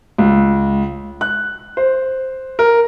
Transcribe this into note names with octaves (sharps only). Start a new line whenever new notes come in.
C#2
F#6
C5
A#4